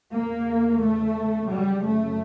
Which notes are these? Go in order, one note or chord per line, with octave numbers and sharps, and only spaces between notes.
E2 C#3 A#3
A3
F#2 C#3 G3
A3